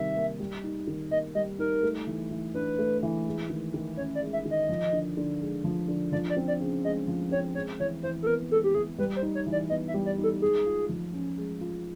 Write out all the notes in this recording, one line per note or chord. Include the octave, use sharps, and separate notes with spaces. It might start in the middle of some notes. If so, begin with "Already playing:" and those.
Already playing: C3 D#3 G3 E5
A#3
G3
D#4
D#3
A#3 D#5
G3 D#5
D#4 A#4
A3
E3
E3
D4 B4
A3
E3
G#3
D#3
D#3
C#4 C#5
D5
G#3
E5
D#3
D#5
F3
D3
D3
G#3
F3
D3
F3 D5
D5
C4
D5
C#3
G#3 D#5
F3
C4 C#5
G#3 C#5
E3 C#5
E3 C5
A4
B3 A#4
G#3 A4
G4
E3 G#4
G3 B4
C5
D#4
C#5
E3
D5
B3 D#5
E5
G3
D5
D#4
A4
G#3 G#4
F4
F3
C#4
G#3
F4